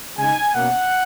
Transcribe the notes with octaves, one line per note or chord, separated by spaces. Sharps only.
C#3 G#3 D#4 G#5
B2 A#3 C#4 F#5